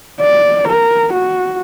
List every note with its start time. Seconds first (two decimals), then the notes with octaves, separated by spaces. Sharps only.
0.21 D5
0.68 A#4
1.13 F#4